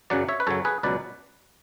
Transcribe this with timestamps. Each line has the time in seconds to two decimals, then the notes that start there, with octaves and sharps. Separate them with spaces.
0.10 F#2 C#3 F#3 D5 F#5
0.29 C#5 E5
0.40 B4
0.47 F#2 C#3 F#3 A4 C#5
0.65 G#4 B4
0.83 C#2 B2 F#3 B4 D5